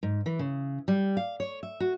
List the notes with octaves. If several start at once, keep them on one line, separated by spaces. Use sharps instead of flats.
G#2
E3
C#3
G3
F5
C#5
E5
F#4